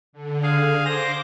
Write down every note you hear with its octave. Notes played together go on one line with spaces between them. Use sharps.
D3
G#4 F5
C5 D6 A#6